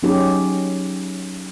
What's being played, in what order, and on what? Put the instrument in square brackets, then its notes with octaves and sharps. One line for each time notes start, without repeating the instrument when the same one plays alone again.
[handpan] F#3 C#4 D#4 G4 G#4